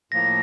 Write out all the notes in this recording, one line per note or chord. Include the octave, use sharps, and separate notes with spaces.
A2 F3 A#3 A#6